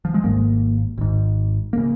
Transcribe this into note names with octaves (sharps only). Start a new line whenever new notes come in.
F3
G#3
G#1 G#2 A#3
G#1 G#2
C#3 A#3